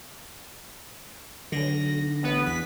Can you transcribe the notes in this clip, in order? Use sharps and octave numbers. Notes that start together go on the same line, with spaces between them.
B1 D3 A#6
A1 B3 B4
E2 B6